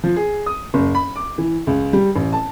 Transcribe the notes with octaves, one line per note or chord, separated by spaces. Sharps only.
F3
G#4
D#6
F#1
B5
D6
E3
C#2
G3
A1
A5